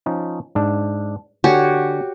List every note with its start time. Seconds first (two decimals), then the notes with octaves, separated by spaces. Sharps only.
0.06 F3 C#4 D#4
0.55 G#2 D4
1.44 D3 F#4 G4 C#5 G#5